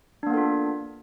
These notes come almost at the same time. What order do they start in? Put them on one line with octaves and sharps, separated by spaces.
D4 A#3 B3 A4 F4